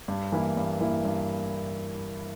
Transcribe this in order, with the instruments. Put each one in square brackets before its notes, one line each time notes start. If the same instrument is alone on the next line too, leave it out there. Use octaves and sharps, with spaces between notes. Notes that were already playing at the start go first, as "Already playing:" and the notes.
[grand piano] G2
E3 A#3 E4
G2
E3 A#3 E4
G2